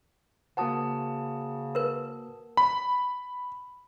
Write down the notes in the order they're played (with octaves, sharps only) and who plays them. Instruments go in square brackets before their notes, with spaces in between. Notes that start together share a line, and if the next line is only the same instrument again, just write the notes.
[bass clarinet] C#3 [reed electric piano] A#3 F#4 C5 [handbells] F#5 A5 D#6
[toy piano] A#4 B4
[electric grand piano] B5